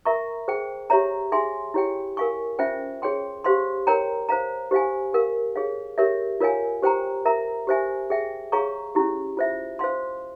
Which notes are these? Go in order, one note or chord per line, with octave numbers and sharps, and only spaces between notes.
A#4 E5 A#5 C#6
G#4 C5 G5
G4 C#5 E5 A#5
G#4 E5 G#5 C6
E4 G4 C#5 G5
A#4 F5 G#5 C#6
C#4 F4 C5 E5 G5
G#4 C#5 G5 C6
G4 C5 F5 C6
A#4 C#5 G5 A#5
C5 F5 A#5
G4 C5 F5 G#5
G4 A#4 F5
G#4 C#5 F5
G4 A#4 C#5 E5
F4 A#4 C#5 F5 G#5
G4 C5 G5 A#5
A#4 E5 A#5
G4 C5 E5 G#5
G#4 E5 G5
G#4 C#5 F5 A#5 C#6
C#4 E4 G4
F4 C5 E5
C5 F5 C6